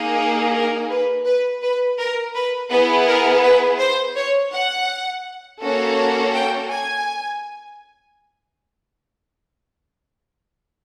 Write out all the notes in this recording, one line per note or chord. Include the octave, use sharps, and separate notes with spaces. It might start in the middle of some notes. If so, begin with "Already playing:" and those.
Already playing: A#3 D#4 G#4
A#4
A#4
B4
B4
B4
A#4
B4
B3 E4 G#4 B4
A#4
B4
C5
C#5
F#5
A#3 C#4 F#4 A4
G5
G#5